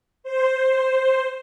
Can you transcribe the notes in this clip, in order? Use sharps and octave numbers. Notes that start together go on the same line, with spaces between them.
C5